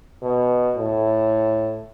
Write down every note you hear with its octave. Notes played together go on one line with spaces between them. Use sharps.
B2
A2